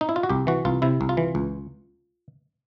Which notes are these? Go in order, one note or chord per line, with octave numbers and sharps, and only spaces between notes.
D#4
E4
F4
F#4
C2 G4
E3 F#4
C2 F4
C3 E4
C2
F4
E3
C#2